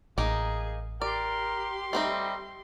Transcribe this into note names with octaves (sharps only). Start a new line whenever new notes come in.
A1 A#3 D#4 G#4
G4 A#4 D5 C6
G3 A3 C4 D#4